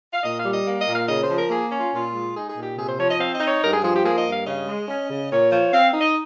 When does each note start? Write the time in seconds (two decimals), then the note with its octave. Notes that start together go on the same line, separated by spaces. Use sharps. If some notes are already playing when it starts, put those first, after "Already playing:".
0.13 F5
0.23 A#2 D#5
0.38 F5
0.45 G3
0.52 D#5
0.66 A#3
0.80 D#5
0.88 A#2
0.94 F5
1.09 C#3 D#5
1.22 C5
1.29 F3
1.37 A#4
1.50 A#3 G#4
1.72 C#4
1.79 F4
1.93 A#2 F4
2.14 G#3
2.35 D#4 G#4
2.50 G#4
2.56 A#2
2.63 G4
2.77 C3 G#4
2.88 C5
2.98 F3 C#5
3.09 D#5
3.19 C4 F5
3.34 D#5
3.40 D#4
3.47 C#5
3.62 G2 A#4
3.72 G#4
3.83 F3 G#4
3.93 G4
4.04 A#3 G#4
4.18 D#5
4.26 G2
4.32 F5
4.46 C#3 D#5
4.68 G#3
4.88 C#4
5.10 C#3
5.31 A#2 C#5
5.51 F3 C#5
5.73 C4 F5
5.94 D#4
6.01 D#5